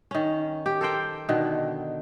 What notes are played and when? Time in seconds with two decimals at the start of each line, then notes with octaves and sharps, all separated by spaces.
0.11 D#3 C#4
0.66 G4
0.81 A4 A#4 C5 G5
1.29 B2 D3 D#3